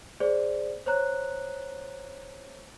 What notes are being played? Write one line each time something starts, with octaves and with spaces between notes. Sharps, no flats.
G#4 C5 D5
C5 C#5 A#5 F#6